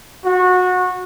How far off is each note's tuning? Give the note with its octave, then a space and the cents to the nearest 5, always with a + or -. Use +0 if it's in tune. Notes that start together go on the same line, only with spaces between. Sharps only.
F#4 -20